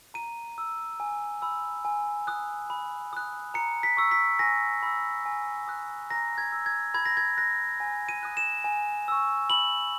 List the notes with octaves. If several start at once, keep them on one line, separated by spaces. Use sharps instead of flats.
A#5 D#7
E6
G#5
B5 E6
G#5
D#6 F#6
B5
D#6 F#6
A#5 C#7
B6
C#6 E6
B6
G#5 A#6
B5 E6
G#5
D#6 F#6
A#5 A#6
G#6
E6
G#6
B5 G#6
A#6
G#6
F#6 A#6
G#5
D#7
D#6 F#6
E7
G#5
C#6 E6
B5 F#7